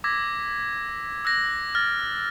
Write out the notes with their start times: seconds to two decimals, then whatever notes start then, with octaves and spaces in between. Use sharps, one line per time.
0.04 D6 E6 G#6 A#6 B6
1.25 E6 F#6 A#6
1.75 F6 A6 A#6